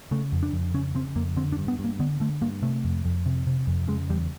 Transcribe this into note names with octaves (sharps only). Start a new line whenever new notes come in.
C#3 A3
F2
D4
F2
C#3 C#4
C#3 C4
F2 A#3
D3 C4
D4
G2
B3
G2
A#3
D3 B3
D3 A3
G2 A#3
C3 A3
F2
F2
C3
C3
F2
C#3 G#3
E2 G3